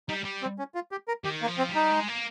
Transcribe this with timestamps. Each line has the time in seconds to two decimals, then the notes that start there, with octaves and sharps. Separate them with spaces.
0.09 G3 D#4
0.24 G3
0.42 C4
0.59 C#4
0.75 F4
0.91 G4
1.08 A#4
1.24 D#3 G4
1.42 A#3
1.47 F3
1.58 C4
1.69 G3
1.75 D#4
1.91 G#3
2.08 A#3